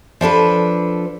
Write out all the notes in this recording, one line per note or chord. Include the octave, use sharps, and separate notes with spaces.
F3 D4 A4 B4